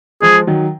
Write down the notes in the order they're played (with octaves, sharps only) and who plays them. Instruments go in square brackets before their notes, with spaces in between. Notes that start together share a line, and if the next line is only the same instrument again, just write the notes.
[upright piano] F3 G#3 [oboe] G#4
[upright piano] D#3 F#3